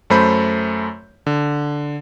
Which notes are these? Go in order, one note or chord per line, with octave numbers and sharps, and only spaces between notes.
F#2 A3 C5 B5 G6
D3